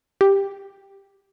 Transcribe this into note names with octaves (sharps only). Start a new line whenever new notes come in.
G4